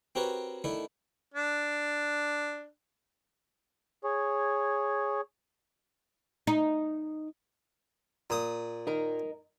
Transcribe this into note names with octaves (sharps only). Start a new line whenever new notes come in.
C4 F#4 G4 A#4 B4 C#5
D#3 A3 D4 E4
D4
G#4 C#5
D#4
A#2 D#6
D#4 A#4